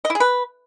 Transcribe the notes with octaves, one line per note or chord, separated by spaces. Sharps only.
D#5
E4
G#4
B4